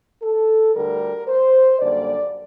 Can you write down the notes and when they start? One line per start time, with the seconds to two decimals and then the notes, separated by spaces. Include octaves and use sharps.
0.22 A4
0.74 D2 D3 G3 A#4
1.28 C5
1.79 F#2 D3 G3 A#3 D5